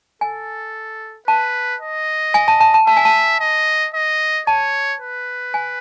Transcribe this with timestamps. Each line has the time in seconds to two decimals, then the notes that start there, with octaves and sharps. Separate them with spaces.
0.21 A4 G#5
1.27 B4 A5
1.81 D#5
2.34 G#5
2.48 A5
2.61 A5
2.74 A5
2.87 E5 A5
2.97 G#5
3.05 A5
3.40 D#5
3.94 D#5
4.47 C#5 A5
5.00 B4
5.54 G#5